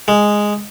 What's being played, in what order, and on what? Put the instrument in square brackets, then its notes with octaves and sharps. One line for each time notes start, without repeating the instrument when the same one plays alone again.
[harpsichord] G#3